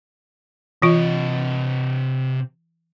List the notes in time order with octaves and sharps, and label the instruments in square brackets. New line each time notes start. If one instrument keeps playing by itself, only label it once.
[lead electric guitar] C3 D#5 [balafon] E3 F4